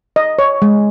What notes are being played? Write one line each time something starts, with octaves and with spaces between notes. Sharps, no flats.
D#5
C#5
G#3